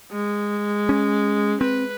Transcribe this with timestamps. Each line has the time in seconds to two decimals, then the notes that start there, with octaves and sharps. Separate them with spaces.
0.12 G#3
0.89 C#4
1.61 C4 B4